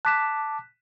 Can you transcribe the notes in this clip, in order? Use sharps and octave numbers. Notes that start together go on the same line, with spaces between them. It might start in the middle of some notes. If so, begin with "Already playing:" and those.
A5 D6 F#6 B6 E7